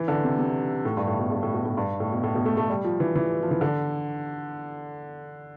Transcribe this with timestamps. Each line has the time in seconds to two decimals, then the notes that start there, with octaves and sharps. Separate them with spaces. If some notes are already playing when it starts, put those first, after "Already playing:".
Already playing: E3
0.08 D3
0.24 C3
0.39 C3
0.85 A2
0.97 G2
1.08 A2
1.19 B2
1.31 G2
1.43 A2
1.54 B2
1.65 A2
1.77 G2
2.00 A2
2.12 B2
2.23 A2
2.35 B2
2.45 A3
2.57 A3
2.69 G3
2.84 F3
3.00 E3
3.16 E3
3.43 F3
3.51 E3
3.61 D3